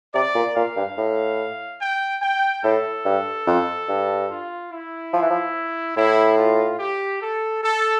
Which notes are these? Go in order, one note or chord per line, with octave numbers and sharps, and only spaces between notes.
C3 D5
A#2
A#2 F5
G2
A2
G5
G5
A2 A4
G2
F2
G2
F4
E4
F3
E3
F3
A2 E4
F4
G4
A4
A4